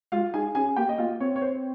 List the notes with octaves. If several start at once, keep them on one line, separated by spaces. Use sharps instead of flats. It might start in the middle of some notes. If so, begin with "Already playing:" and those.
G#3 F4 F5
D#4 G#4 G#5
C#4 G#4 G#5
A#3 G4 G5
D#5
A#3 F4 F5
C4 C#5
C#5
C5